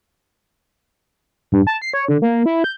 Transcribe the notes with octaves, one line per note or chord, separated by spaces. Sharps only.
G2
A5
C7
C#5
D3
A#3
E4
G6